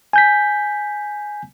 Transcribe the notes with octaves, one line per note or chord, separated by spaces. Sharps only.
G#5 G6 B6